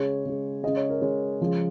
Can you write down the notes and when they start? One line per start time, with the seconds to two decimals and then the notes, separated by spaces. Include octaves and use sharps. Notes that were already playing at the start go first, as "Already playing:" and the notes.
Already playing: C#3 G#3 C#5
0.25 C#3 G#3
0.63 C#3 G#3 D#5
0.76 C#5
0.89 A#4
1.01 C#3 G#3 C#5
1.41 C#3 F3 G#3